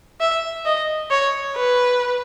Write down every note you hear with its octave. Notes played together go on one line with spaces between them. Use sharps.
E5
D#5
C#5
B4